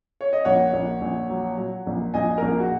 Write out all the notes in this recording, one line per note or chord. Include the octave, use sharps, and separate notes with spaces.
C#5
D#5
A#1 C#5 F#5
A#1
A#1
F#3
F#3
A#1
A#1 D#5 G#5
A#1 A#4
G#4
F#4